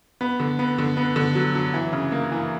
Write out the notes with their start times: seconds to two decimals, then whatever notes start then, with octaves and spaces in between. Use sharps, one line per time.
0.21 B3
0.40 D3
0.59 B3
0.79 D3
0.97 B3
1.16 D3
1.35 F#3
1.55 F#3
1.74 E3
1.93 C#3
2.12 A#3
2.32 E3